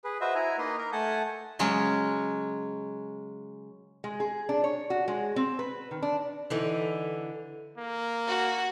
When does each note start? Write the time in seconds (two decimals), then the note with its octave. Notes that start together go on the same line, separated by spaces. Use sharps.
0.04 G#4 B4
0.21 F#4 B4 C5 D#5 E5
0.35 E4 G#5 A#5
0.58 A#3 D#4 B4 D#5 C6
0.78 A#4 A#5
0.92 A3 F#5 G#5 A5 G6
1.59 C#3 F#3 G#3 C#4
4.04 G#3
4.20 G#4
4.49 D4
4.64 C#5
4.90 F#4
5.08 G#3
5.36 C4
5.59 B4
5.91 D#3
6.02 D4
6.50 D3 E3 D#4
7.77 A#3
8.27 F#4